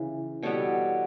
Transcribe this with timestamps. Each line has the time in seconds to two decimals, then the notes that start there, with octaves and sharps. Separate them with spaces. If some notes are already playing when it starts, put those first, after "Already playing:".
Already playing: C#3 E3
0.43 B2 G3 B3 A4 C#5